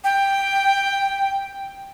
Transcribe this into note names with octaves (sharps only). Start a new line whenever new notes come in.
G5